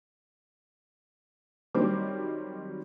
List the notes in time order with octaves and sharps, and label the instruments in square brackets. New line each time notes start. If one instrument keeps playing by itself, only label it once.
[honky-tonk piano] D#3 F#3 G3 C4 C5 D6